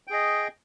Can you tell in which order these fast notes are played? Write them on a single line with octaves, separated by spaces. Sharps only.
G5 G#4 D#5